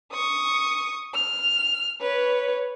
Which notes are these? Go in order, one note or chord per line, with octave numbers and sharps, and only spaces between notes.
C#6 D#6
F6
B4 C#5